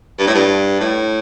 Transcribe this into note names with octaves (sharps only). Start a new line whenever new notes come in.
G2
A2
G2
A2